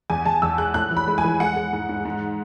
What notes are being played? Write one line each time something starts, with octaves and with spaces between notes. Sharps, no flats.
E2 G#5
E2 A5
E2 E6
G#3 F#6
A2 F#6
E3
B5
G#3
G#5
E3
G#3 F#5
G#3
G#2
G#2
G#2